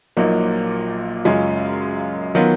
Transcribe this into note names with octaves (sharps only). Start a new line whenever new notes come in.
A#1 A#2 F#3 A#3 D#4
F#2 C#3 G#3 C#4 F4
D#3 F#3 B3 F4